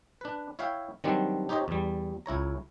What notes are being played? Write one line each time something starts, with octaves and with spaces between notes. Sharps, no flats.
D4 B4
E4 C#5 E5 F5 G5
D#3 F#3 G3 C4 D4
D#4 G4 C5 C#5 D#5
E2 G3
C#2 E4 C#5 A#5